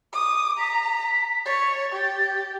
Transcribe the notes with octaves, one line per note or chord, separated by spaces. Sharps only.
D6 D#6
A#5 B6
C#5 A6
G4